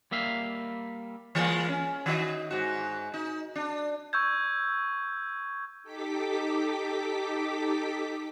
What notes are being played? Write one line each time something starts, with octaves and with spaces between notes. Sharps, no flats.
G3 A#3 E5 F5
E3 G#3 A#3
C#4
D#3 F#4 D#5
G#2 F#4
D#4
D4
C#6 E6 G6 G#6
D#4 G4 A4 D6 B6